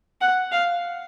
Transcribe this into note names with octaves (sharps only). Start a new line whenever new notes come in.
F#5
F5